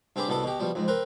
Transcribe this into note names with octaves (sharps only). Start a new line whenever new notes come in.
G2 C4 G4 G#4 B5 D6
C2 B2 B3 A4 D6
B2 G4
B2 F3 G3
F2 G#2
C4 A#4 B4